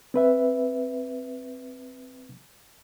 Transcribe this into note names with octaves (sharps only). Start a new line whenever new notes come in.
C4 B4 E5